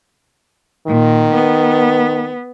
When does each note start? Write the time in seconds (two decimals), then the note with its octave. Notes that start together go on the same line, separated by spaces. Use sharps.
0.87 A#2 D#3
1.32 B3